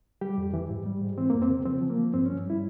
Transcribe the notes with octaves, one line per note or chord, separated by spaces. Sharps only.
G3 G4
F2
E3
G#2
G3
G#2
E3 C4
F2 A#3
C4
C#3
F3 C4
F3
A#3
F3
G2 C4
G2 C#4
G3 E4